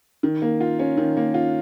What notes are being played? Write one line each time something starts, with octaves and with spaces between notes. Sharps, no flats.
D#3
A#3
F4
C#4
D#3
A#3
F4